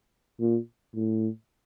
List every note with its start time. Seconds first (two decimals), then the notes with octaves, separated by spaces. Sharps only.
0.40 A#2
0.95 A2